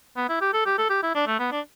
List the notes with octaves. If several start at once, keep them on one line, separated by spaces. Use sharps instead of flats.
B3
E4
G4
A4
G4
A4
G4
E4
D4
A3
B3
D4